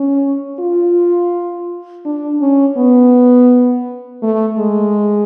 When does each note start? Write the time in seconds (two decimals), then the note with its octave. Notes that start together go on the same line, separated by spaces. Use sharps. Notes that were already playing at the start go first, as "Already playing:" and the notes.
Already playing: C#4
0.60 F4
2.05 D4
2.41 C#4
2.77 B3
4.23 A3
4.58 G#3